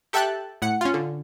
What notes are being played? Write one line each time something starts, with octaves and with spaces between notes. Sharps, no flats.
G4 A4 E5 G5 A5 F#6
A2 F#5 C#7
C#4 F4
D3